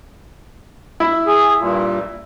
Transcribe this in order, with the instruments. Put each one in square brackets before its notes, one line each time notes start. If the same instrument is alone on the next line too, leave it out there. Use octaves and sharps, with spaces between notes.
[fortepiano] E4
[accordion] G#4
G2 A#2